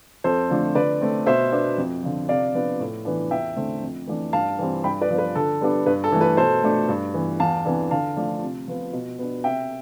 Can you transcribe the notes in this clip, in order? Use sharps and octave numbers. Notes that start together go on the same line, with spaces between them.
F2 A4 C5
D3 F3 A3 D4
D3 B4 D5
A3 C4
B2 C5 E5
B3 D4
F2
D3 F3
C3 D5 F5
F3 B3 D4
A2
E3 B3 D4
E2 E5 G5
D3 A3 C4
F2
E3 A3 D4
G2 F5 A5
E3 G3 C4
G2 G5 B5
B4 D5
F3 B3
B4
D3 A4
G3 B3 D4
G2 B4
A4
E3 A3
B4
B2 A4 C5
A3 D4
G2
E3 B3
E2 F5 A5
C3 E3 B3 D4
D3 F5 A5
F3 A3 D4
C3
F3 B3
B2
B3 D4
C3 E5 G5